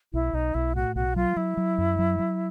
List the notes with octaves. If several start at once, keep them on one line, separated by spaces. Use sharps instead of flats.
B1 E4
B1 D#4
B1 E4
A2 F#4
B1 F#4
F#3 F4
F#3 E4
F#3
F#2
F#3
F#3